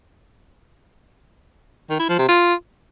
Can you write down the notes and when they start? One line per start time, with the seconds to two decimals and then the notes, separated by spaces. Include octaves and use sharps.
1.90 D#3
1.99 E4
2.09 F3
2.19 C3
2.28 F4